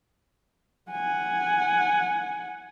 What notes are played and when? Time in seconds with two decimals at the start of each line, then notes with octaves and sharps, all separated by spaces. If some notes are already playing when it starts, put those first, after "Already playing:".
0.91 F#5 G#5